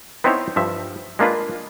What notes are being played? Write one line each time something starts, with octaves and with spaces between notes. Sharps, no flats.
B3 C4 D#4 E4 C5 C#5
G2 F3 E5
G#3 A#3 D4 F4 B4